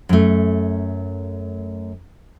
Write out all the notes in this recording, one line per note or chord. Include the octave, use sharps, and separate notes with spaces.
F#2 A3